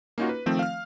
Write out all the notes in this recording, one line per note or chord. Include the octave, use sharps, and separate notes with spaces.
A#3 C#4 D#4 F4 F#4
B4
D#3 F3 A3 C4
F5 F6